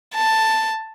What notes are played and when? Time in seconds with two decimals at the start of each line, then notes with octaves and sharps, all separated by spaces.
0.14 A5